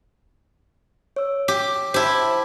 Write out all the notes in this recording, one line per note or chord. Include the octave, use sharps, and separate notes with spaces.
C#5 E6
G4
E4 G4 C5 A5